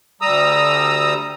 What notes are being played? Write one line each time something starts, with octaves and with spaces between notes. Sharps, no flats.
D2 G3 A#5 D#6 E6